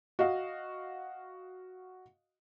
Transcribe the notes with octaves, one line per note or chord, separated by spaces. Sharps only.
F#4 D#5 F5